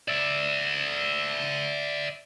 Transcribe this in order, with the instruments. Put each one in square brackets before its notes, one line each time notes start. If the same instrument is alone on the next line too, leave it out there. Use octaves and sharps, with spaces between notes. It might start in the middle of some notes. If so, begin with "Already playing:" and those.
[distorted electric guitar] D5 E5